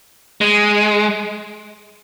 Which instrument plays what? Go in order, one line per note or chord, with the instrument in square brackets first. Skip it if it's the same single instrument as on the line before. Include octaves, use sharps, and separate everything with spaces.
[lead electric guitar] G#3